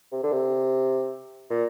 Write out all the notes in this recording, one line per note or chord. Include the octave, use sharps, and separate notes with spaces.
C3
D3
C3
A#2